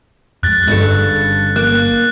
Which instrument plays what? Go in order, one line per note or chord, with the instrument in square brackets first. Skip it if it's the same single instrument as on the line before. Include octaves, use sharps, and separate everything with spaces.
[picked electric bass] F2 G#3 [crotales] F#6 A6
[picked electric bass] G1 [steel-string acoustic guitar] G2 C#3 A4
[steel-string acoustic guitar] A#3 [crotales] F#6